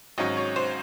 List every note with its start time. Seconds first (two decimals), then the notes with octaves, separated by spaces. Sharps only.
0.18 G#1 G#2 F#3 C#4 D#5
0.37 C#5
0.56 C5